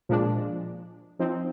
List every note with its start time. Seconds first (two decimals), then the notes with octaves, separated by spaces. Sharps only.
0.09 A#2 F3 G#3 D4
1.19 F3 C4 D#4